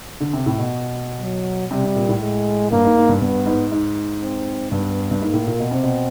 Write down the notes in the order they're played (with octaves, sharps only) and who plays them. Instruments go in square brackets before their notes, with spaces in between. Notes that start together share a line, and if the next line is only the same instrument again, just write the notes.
[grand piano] D3
C3
A2
B2
[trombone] F#3
[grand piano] C3 [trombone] G3
[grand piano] C3
A#2
A2
[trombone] G#3
[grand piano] G2 [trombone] A#3
[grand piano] G#2
G#2
G2
[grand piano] G2 [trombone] B3
[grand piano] G#2
G#2
[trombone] C4
[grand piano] G2 [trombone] B3
[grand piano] G2
[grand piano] G#2 [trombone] A#3
[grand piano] A2
A#2
B2
[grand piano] C3 [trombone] C4
[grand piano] B2